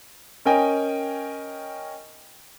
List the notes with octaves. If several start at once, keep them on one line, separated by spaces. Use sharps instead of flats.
C#4 A#4 D#5 G5 G#5